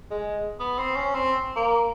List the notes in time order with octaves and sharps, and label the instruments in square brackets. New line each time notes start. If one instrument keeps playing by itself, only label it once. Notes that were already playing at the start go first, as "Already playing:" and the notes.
[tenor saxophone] G#3
B3
C4
C#4
C4
A#3